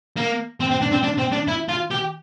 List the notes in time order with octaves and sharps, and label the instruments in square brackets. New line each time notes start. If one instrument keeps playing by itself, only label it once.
[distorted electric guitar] A#3
C4
C4
D4
C4
D4
C4
D4
E4
F4
G4